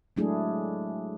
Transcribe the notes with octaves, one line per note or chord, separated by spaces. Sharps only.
F#3 G#3 A3 D4 E4 G#4